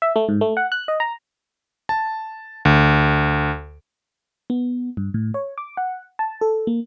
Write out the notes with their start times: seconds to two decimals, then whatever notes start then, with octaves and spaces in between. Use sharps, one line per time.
0.02 E5
0.16 A3
0.29 G#2
0.41 A3
0.57 F#5
0.72 F#6
0.88 D#5
1.00 A#5
1.89 A5
2.65 D2
4.50 B3
4.97 G2
5.14 A2
5.34 C#5
5.58 D6
5.77 F#5
6.19 A5
6.41 A4
6.67 A#3